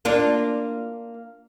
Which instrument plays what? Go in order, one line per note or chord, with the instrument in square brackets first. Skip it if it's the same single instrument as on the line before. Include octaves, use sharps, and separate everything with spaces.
[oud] A#3 D4 F4